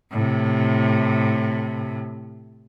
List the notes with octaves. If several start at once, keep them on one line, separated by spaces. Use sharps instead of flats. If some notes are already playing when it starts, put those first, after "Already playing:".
A2 C3